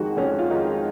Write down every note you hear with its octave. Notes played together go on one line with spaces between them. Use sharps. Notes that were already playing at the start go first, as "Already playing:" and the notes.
Already playing: F2 D#3 G#3 F#4
F2 C#4
F4
D#3 G#3 D#4